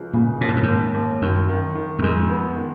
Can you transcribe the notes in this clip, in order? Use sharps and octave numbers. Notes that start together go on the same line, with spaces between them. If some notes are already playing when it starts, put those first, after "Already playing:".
Already playing: C#2 F3
A#2 C#3
D#2 A#2
G#2
F#2
D#2 G#2
D#2
F#2 D#3
D#3
D#3
F#2
F2 G#3
B3
D#3